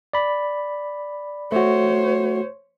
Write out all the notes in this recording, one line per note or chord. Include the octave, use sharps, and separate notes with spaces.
D5 B5
A3 F#4 C5 C#5